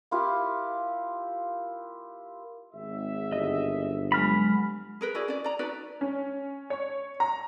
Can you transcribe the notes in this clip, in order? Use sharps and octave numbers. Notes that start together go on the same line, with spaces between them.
A#3 E4 F4 G4
G#1 E5
G1 D#5
F#3 G#3 B5 F6
G#4 A#4 B4
E4 F#4 G#4 D5
C#4 D5
D5 A#5
D#4 F#4 B4 D5
C#4
C#5
A#5